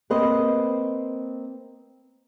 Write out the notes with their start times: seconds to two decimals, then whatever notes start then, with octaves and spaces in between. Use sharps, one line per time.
0.10 A#3 C4 B4 C5 D#5